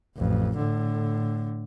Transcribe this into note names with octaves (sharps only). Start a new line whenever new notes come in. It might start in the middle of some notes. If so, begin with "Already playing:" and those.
A1 F2
A2 D3